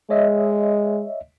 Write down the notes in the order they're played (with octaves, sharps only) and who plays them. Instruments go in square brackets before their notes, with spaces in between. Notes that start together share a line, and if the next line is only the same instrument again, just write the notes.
[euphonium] G#3 [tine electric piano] C#5 D#5 E5